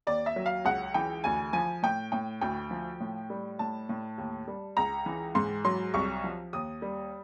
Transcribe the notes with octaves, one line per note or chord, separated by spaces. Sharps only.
D#2 D5
E5
F#3
F5
C#2 F#5
E3 G5
D2 G#5
F3 G#5
A2 G5
A2 G5
D2 G5
F3
A2
G3
A2 A5
A2
D#2
G3
C#2 A#5
E3
G#2 C6
F#3 C6
C2 C#6
F3
D#2 D#6
G3